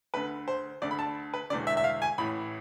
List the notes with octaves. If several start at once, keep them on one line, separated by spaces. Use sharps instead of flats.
D2 D3 B4
C5
D2 D3 D5
B5
A5
B4
E1 E2 D3 D5
E5
E5
F5
G#5
A1 A2 E3 B5